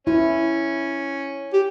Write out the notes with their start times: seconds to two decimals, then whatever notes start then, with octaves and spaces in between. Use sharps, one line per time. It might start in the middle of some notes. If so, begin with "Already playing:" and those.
0.07 C#4 E4
1.53 G4